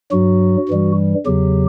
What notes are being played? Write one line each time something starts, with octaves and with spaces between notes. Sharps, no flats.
G2 F#3 F#4
G2 E3 G3
E2 C#3 F#3 G4